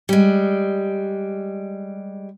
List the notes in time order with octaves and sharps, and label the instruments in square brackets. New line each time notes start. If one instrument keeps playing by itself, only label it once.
[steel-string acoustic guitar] G3 G#3